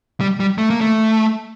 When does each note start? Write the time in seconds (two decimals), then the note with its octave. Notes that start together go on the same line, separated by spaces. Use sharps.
0.21 G3
0.40 G3
0.58 A3
0.70 A#3
0.81 A3